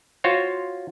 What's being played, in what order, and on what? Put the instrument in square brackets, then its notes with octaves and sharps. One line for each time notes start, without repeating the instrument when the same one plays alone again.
[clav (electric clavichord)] F4 F#4 C5 C#5